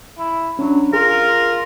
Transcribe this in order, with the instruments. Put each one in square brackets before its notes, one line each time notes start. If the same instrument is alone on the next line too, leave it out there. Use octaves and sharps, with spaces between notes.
[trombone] E4
[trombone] F#3 [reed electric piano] C#4 D4
[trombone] F4 [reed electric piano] G#4 [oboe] A#4